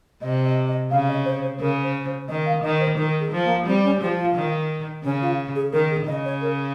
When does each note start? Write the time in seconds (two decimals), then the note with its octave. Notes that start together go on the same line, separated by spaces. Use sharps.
0.22 C3 D#5
0.45 D#5
0.69 D#5
0.91 C#3 F5
1.09 D#5
1.25 C5
1.42 C5
1.60 C#3 A#4
1.83 C5
2.06 C5
2.28 D#3 D#5
2.46 F5
2.63 D#3 D#5
2.80 C5
2.97 D#3 A#4
3.20 G#4
3.32 F3
3.44 A#3
3.66 G3 C4
3.84 C#4
4.01 F3 G4
4.18 F4
4.35 D#3
5.04 C#3 C#4
5.22 F4
5.55 G#4
5.73 D#3 A#4
5.91 G#4
6.07 C#3 D#5
6.25 C#5
6.41 A#4